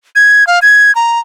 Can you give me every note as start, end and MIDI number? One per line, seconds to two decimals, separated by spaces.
0.15 0.47 92
0.47 0.59 77
0.62 0.94 92
0.95 1.19 82